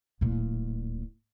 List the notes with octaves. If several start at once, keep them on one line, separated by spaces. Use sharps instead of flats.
D1 A#2